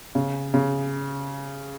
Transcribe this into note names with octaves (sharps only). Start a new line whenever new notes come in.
C#3
C#3